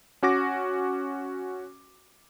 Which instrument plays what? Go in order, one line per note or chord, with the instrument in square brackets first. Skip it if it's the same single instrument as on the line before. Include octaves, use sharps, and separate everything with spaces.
[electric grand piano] C#4 F#4 D6 A#6